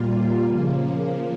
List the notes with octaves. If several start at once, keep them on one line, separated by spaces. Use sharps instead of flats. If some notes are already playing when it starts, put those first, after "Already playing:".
Already playing: A#2 G3 A#3 F4
C#3 F3 A#3